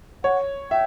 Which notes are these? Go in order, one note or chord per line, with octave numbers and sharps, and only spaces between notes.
C#5 F#5
E5 G5